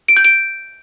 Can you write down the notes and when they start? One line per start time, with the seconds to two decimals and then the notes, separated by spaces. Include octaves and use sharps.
0.08 D7
0.17 G6
0.25 D7